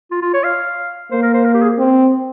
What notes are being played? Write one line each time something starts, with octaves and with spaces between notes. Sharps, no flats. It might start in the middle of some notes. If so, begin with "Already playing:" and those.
F4
F4
C#5
F5
A#3 C5
A#4
C5
A#4
G4
G#4
C4